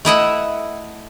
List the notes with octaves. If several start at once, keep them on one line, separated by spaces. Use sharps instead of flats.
A3 E4 D#5 F#5